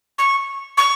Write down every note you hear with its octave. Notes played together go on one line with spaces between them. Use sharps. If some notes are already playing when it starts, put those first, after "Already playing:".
C#6
C#6